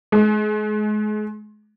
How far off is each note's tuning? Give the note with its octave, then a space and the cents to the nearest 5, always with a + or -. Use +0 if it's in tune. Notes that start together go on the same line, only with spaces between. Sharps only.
G#3 +35